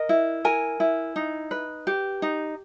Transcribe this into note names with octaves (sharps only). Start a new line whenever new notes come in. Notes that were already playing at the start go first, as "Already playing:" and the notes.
Already playing: A#4 D#5
E4
A#4 G#5
E4
D#4
B4
G4
D#4